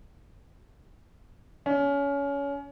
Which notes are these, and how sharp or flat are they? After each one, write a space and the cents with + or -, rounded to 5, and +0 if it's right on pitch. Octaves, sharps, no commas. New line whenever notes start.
C#4 +25